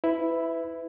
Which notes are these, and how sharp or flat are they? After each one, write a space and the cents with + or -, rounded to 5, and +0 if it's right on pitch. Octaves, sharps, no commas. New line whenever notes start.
E4 +0 B4 +25